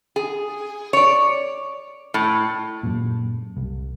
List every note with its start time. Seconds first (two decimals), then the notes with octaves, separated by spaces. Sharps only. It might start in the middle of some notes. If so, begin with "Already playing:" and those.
0.16 G#4
0.93 C#5 D5
2.14 A2
2.83 F#2 A#2
3.57 C2